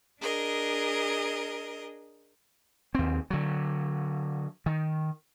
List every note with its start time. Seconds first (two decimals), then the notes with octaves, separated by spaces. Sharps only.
0.20 D4 G#4 A#4 D#5
2.95 D#2 C4
3.30 D3 F#3
4.66 D#3